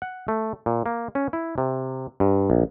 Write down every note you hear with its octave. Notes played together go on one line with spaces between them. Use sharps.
F#5
A3
A#2
A#3
C#4
E4
C3
G2
A#1